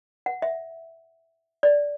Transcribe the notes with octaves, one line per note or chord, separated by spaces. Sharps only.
F#5
E5
D5